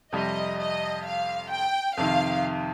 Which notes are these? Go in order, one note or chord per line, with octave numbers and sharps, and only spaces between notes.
F2 C3 G3 D#5
D#5
F5
G5
F2 C3 D#3 F5